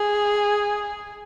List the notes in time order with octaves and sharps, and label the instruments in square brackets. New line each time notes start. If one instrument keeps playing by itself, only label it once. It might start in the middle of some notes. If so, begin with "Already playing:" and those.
Already playing: [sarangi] G#4